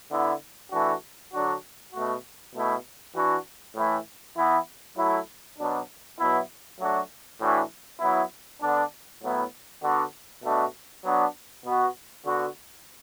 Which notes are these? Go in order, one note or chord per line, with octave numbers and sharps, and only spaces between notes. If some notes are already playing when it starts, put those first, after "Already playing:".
D3 B3 E4
E3 A3 D4 F#4
D3 F#3 D4 F#4
B2 A3 F#4
B2 A3 E4
E3 D4 F#4
A2 E3 A3 E4
E3 B3 E4
F#3 A3 E4
B2 F#3 D4
B2 F#3 B3 E4
F#3 A3 D4 F#4
A2 E3 D4 F#4
F#3 B3 E4
D3 B3 D4
A2 F#3 B3 E4
D3 B3 D4 F#4
B2 A3 D4 F#4
F#3 B3 D4 F#4
B2 B3 F#4
D3 B3 F#4